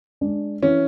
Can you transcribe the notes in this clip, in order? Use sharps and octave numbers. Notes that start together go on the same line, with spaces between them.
G#3 D4
E3 C#4